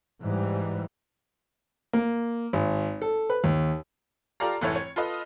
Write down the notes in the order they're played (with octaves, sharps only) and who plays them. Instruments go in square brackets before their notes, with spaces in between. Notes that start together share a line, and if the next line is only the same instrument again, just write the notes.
[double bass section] G#2 E3 G3
[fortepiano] A#3
G#1
A4
B4
D#2
[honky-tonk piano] F4 G4 A4 D5 F5 A#5
F1 G#2 E3 E4 A4 C#5
C#5
F4 A4 B4 D#5